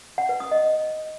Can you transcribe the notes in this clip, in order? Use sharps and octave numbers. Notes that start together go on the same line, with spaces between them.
F#5
B4
D#6
D#5